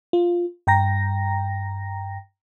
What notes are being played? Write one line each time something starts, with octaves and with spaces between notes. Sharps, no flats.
F4
G2 G5 A#5 A#6